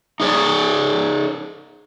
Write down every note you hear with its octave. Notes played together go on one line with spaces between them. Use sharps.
D#4 G#4 C#5 D5